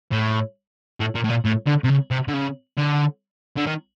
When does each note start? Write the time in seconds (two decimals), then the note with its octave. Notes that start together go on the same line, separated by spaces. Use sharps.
0.12 A2
1.00 A2
1.15 A#2
1.24 A2
1.30 A#2
1.45 A2
1.67 D3
1.84 C3
1.89 C#3
2.11 C3
2.28 D3
2.33 C#3
2.77 D3
3.57 D3
3.67 D#3